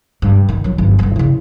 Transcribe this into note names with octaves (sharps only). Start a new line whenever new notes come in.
G2
D#3
D#3 F#3
G1
G2 D3
C#3 E4